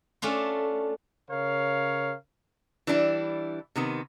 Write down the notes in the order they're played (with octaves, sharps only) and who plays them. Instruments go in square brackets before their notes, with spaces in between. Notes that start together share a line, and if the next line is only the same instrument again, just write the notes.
[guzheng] A3 C#4 D4 F4
[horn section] C#3 A#4 C#5 F5
[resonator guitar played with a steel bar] E3 G3 D4 E4
C3 D#3 B3